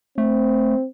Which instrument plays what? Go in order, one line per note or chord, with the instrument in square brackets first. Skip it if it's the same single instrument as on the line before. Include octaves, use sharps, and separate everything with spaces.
[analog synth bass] A3 [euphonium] C4